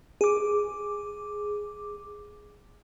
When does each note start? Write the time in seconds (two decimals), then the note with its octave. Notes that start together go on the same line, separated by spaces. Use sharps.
0.21 G#4 D6